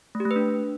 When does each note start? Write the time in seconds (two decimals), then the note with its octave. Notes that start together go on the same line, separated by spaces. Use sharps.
0.15 A3
0.20 G4
0.25 A3
0.31 B4
0.36 D4